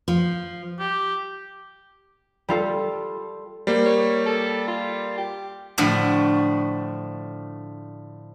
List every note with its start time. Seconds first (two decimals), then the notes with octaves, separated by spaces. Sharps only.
0.08 F3
0.80 G4
2.48 G3 F4 A4
3.67 G3 A#3 C5
3.86 C#5
4.26 A4
4.68 F4
5.18 G4
5.78 A2 D3 F3 A3 D4 F#4